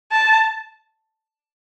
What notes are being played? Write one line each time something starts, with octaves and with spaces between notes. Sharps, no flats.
A5